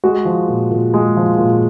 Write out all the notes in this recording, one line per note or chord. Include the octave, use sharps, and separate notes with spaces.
G#3 F#4
F3
A#2
A#2
G#3
F3
A#2